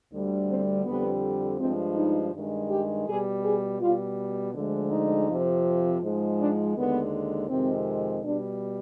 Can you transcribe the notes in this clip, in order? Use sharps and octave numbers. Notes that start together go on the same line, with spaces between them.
D2 D3 G3
C4
F2 D3 G3 B3
G2 F3 G#3 C4
D#4
G2 D#3 G#3
G4
B2 G3 G#4
G#4
B2 G3 F4
D2 D3 F3 G#3
D#4
F2 C3 F3
G#2 F3 G#3
D4
D#2 D3 G#3 B3
F2 C3 D#3 G#3 C4
B2 G3 D4